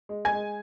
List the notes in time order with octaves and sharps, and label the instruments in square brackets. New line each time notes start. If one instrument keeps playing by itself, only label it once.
[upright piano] G#3
G#5 G#6
G#3